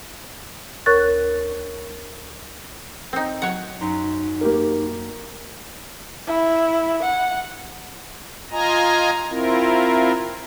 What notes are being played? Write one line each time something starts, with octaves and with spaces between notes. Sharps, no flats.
D2 A#4 C#5 C#6 F#6 A6
C4 D#4
F#3 C#5 F#5
F#2 D#4 A#5 C6
A#3 G4 A#4
E4
F#5
F4 D#5 G#5 A#5
C4 E4 F4 A#4